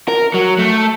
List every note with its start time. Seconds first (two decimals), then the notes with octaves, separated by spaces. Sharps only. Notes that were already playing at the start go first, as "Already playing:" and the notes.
0.08 A#4
0.34 F#3
0.59 A3